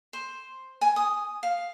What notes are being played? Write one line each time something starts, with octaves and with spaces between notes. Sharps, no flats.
C5
G#5
D#6
F5